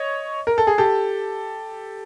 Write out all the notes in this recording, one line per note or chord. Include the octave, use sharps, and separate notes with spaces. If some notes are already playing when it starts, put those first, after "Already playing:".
Already playing: C#5 D#5
A#4
A4
G#4
G4 A4